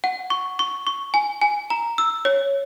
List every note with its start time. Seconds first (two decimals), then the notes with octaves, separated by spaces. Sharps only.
0.04 F#5
0.30 C#6
0.59 C#6
0.87 C#6
1.14 G#5
1.41 G#5
1.70 A#5
1.98 E6
2.25 C#5